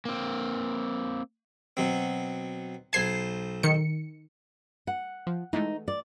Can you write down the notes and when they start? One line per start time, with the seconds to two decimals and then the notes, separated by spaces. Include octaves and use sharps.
0.05 A#3 C4
1.77 B2 F#3 C4
2.93 B1 C5 A5 G#6 C7
3.63 D#3 C#7
4.87 F#5
5.27 F3
5.53 E3 G#3 A3 D#4
5.88 D5